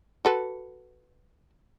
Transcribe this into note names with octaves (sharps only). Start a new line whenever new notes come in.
F#4 A4 B4